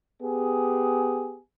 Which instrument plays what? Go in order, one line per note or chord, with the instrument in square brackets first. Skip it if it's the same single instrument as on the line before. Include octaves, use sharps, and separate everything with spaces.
[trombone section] B3 G4 G#4